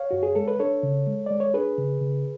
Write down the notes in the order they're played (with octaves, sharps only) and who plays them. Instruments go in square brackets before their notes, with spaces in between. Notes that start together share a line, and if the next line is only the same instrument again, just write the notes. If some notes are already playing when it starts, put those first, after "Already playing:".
Already playing: [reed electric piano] C#5 F5
F#2 F#4
G#4
G#3 A4
B4
D4 A4 C#5
C#3
G#3
G#3 D5
C#5
D4 G#4 B4
C#3
C#3